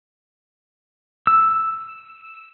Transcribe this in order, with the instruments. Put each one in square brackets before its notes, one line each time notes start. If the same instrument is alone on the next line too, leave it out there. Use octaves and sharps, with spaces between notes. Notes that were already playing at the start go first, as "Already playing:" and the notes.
[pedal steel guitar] E6